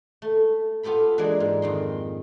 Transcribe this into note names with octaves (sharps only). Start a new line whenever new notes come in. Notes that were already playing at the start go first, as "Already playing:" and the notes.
A3
B3 F4 G4 A4 B5
E3 G#3 A#3 D4 G#4 D5
G#2
F2 D#3 C6